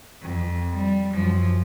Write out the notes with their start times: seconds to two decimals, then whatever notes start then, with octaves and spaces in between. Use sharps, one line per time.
0.22 F2
0.76 G3
1.13 F#2 F3